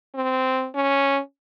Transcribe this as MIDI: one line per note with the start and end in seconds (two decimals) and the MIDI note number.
0.15 0.68 60
0.75 1.19 61